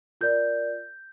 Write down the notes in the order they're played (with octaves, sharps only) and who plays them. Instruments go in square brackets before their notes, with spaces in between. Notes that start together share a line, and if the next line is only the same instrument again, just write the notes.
[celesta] F4 A#4 D5 G6